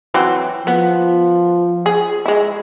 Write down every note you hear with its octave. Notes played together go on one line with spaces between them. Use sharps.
E3 F#3 C4
F3 B3
G#4
G#3 E4